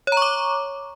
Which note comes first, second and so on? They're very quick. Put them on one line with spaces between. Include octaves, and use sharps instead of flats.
C#5 A#5 C#6 D6